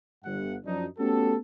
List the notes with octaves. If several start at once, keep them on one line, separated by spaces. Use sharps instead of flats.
G1 G2 F#5
F#2 F3 D4 D#4
A3 B3 C#4 F#4 G4 A4